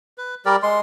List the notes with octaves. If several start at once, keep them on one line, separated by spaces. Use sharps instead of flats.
B4
G3 G4 A#4 D5
G#3 C6